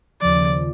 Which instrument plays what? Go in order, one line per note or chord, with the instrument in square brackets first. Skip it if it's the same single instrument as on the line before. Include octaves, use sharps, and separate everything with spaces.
[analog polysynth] D#2 C#3 F3 [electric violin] D5